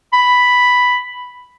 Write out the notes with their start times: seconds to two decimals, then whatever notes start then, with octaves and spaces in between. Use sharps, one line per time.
0.13 B5